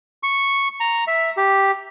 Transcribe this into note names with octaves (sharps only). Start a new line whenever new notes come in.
C#6
A#5
E5
G4